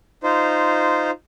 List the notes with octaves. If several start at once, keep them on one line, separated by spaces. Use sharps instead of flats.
D#4 F4 C5